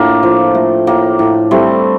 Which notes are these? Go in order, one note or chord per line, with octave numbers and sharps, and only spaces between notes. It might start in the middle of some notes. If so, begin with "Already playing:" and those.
Already playing: A2 A3 A#3 D4 F4
F3
A3
A2 A#3
A2
G3 A3 C4